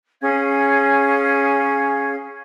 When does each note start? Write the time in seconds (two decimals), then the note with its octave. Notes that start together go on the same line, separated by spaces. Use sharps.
0.22 C#4 G#4 F5 G#6